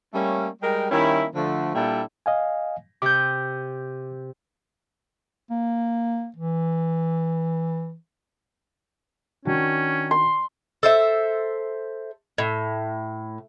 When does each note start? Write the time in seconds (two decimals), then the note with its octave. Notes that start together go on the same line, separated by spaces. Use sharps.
0.13 G3 A3 A#3 C#4
0.62 G3 G#3 A#4 G5
0.91 D#3 G3 A#3 C#4 E4
1.35 D3 F3 A3
1.75 A#2 G3 D4 E4 A4 G5
2.26 D#5 F5 G#5
3.02 C3 D6 G6
5.51 A#3
6.36 E3
9.45 D#3 C#4 D4 F#4
10.11 C6
10.83 A4 C5 E5
12.38 A2